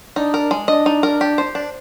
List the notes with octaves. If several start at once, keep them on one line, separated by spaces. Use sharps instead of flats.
D4 D#4
A#4
G#3
D4 D#5
D#4
A#4
G4
C5
D4